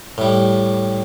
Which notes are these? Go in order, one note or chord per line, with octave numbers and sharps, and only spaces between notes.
A2 G3